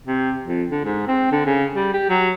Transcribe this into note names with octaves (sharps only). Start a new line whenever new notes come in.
C3
F2
D3
G#2
C4
D3
C#3
G3
G4
F#3